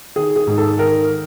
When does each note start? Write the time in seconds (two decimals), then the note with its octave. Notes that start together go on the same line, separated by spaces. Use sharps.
0.16 D#3 G#4
0.36 G#4
0.47 G#2
0.58 A4
0.78 D#3 A#4